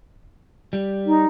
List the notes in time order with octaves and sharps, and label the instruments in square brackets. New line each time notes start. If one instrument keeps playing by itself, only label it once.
[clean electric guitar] G3
[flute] D#4